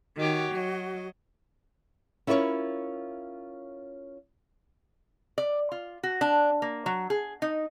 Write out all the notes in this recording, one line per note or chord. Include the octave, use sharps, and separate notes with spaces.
D#3 F#4 G4 C#5
F#3 D#5
C#4 E4 F4 A#4 C5 C#5
D5
F4
F#4
D4
A#3
F#3
G#4
D#4